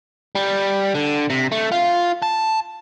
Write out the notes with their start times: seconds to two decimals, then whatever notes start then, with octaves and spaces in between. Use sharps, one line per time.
0.35 G3
0.95 D3
1.30 C3
1.52 A3
1.72 F4
2.22 A5